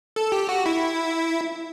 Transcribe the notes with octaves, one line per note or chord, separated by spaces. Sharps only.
A4
G4
F#4
E4